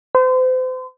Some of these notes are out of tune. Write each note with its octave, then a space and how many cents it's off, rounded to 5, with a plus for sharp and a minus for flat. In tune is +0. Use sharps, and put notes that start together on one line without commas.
C5 -40